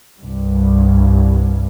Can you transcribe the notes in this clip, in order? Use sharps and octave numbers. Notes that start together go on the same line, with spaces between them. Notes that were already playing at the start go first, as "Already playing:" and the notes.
C2 G2